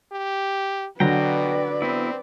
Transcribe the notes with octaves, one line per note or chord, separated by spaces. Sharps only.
G4
B2 D3 F#3 B4 D5 G5 A#5
B3 C4 E4